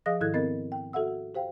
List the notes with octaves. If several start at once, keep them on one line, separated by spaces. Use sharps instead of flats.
F3 G#4 D#5 F5 D#6 A#6
G#2 D#3 E4 A4 F#6 G#6
B3 C4 A#4 D#5 A6
G5
F#4 A4 E5 F#5 E6
G4 C5 F5 G5